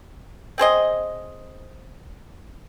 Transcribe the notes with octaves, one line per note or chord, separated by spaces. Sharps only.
C4 G#4 C5 D#5